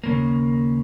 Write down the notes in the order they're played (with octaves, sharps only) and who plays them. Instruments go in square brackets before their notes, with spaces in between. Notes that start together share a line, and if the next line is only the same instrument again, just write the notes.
[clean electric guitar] D#2 C#3 A#3